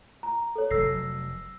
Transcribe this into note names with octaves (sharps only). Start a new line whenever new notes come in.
A#5
A4 C#5
F1 F#3 E6 A#6 C7